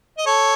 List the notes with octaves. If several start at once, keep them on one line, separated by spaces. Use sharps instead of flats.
D#5
A4 C#5